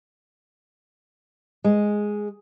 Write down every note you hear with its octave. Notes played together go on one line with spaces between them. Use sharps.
G#3